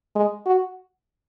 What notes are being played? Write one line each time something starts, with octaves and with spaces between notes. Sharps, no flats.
G#3
F#4